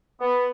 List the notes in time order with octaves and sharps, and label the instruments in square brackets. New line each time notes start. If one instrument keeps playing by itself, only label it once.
[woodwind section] B3